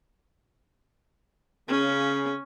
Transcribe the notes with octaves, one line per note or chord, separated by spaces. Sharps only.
C#3 C#4